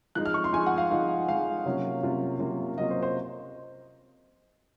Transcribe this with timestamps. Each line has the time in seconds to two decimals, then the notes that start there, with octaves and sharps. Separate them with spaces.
0.15 F3 G#3 D#4 F#6
0.26 F6
0.34 C#6
0.44 C6
0.53 F3 G#3 D#4 G#5
0.66 F#5
0.78 F5
0.90 F3 G#3 D#4 F5
1.28 F3 G#3 D#4 F5
1.66 C3 F#3 A#3 C#4 F4
2.03 C3 F#3 A#3 C#4 F4
2.40 C3 F#3 A#3 C#4 F4
2.78 C3 F#3 A#3 C#4 F4 D#5
2.91 C5
3.03 C5